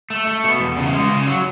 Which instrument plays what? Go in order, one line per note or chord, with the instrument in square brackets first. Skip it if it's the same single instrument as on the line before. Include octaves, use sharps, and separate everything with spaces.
[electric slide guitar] A3
A3
B2
E2
C#3
G#3
C#3
F#3